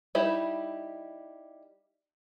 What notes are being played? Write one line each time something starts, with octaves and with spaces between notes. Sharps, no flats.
G3 D#4 E4 G4